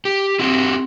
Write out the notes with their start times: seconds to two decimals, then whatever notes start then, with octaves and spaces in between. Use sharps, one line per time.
0.05 G4
0.39 C4 E4 F#4 G4